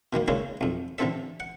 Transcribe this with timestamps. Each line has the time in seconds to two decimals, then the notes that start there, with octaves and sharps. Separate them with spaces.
0.13 B2 D#3 G3 A#3
0.28 G2 C#3 G#3 A#3 C#4 E4
0.61 B1 F2
0.98 A1 D3 E3 C4 A4 E5
1.40 F#5